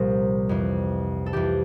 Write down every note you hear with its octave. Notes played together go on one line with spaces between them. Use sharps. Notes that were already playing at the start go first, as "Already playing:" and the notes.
Already playing: C2 A#2 F3 A#4 C5
F2 E3
A4
F2 E3 G4